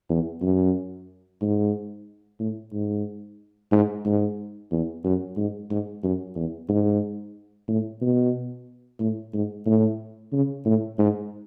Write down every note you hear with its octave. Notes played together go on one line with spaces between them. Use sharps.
E2
F#2
G#2
A2
G#2
G#2
G#2
E2
F#2
G#2
G#2
F#2
E2
G#2
A2
B2
A2
G#2
A2
C#3
A2
G#2